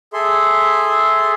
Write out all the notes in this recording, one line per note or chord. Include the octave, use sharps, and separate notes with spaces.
G#4 A4 E5 C6